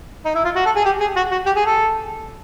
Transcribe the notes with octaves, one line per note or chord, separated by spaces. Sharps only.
D#4
E4
F4
F#4
A4
G#4
G4
G#4
F#4
F#4
G4
G#4
A4